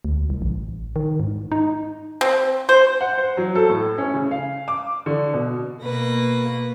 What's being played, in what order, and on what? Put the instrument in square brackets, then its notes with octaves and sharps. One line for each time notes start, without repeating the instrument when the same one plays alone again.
[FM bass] D2
C2
A1
D#3
G#2
D#4
[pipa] C4
C5
[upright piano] F#5
C5
F#3
A4
A2
C#4
C#3
F5
D6
D3
B2
[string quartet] B2 A#3 B4 A#6